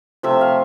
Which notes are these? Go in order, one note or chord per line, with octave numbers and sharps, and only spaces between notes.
C3 F3 A3 E5
F5